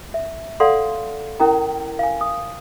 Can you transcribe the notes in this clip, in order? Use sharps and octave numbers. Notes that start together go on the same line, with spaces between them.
E5
A4 D5 F5 F#5 C6
C#4 E4 A#4 G5 A5 A#5
F5 G#5
D#6